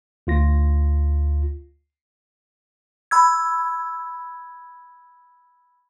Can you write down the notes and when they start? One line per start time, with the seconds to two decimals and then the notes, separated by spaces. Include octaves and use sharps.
0.27 D2 F4 A#6
3.11 B5 E6 G#6